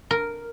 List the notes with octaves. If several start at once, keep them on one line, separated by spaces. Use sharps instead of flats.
A#4